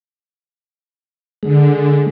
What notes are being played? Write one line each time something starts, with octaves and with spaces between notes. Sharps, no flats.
D3 G#3